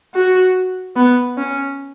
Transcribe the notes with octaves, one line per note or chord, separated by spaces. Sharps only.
F#4
B3
C#4